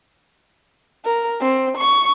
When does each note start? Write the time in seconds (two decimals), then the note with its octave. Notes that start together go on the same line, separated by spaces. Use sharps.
1.06 A#4
1.41 C4
1.78 C#6